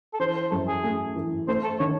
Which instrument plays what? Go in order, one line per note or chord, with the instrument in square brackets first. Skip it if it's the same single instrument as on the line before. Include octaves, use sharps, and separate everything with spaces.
[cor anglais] A4
[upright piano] E3 [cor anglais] C5
[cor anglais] C5
[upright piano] F#2 [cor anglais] A4
[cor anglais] G#4
[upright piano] A3
E3
[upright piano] A3 [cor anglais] C5
[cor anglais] A4
[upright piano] D#3 [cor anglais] C#5